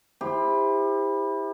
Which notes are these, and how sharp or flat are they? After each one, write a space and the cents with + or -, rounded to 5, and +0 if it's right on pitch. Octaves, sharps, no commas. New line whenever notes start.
E4 -10 G4 +30 C5 +0